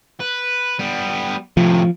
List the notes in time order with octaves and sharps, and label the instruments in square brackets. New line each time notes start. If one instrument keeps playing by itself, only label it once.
[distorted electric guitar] B4
G3 B3
[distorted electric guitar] A2 C3 [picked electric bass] F3